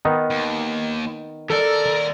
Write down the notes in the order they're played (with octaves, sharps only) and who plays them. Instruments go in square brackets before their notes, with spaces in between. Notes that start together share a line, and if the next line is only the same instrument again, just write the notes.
[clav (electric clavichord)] D#3 B3 D#4
[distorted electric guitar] D#2
[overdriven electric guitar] D#2 D5 [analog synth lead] A4 [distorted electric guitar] A#4